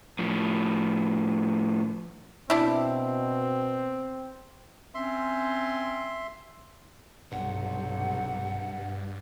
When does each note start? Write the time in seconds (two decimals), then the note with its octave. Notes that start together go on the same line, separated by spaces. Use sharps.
0.19 A2 F3
2.50 B2 C4 D4 E4
4.94 C4 C#4 E5 C6
7.32 B1 G2 C3 F#5